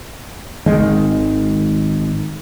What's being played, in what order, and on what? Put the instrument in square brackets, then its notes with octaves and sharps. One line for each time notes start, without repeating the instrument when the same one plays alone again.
[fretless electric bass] G#1 D#3 G#3